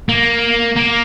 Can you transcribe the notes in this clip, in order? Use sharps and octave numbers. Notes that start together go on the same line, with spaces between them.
A#3
A#3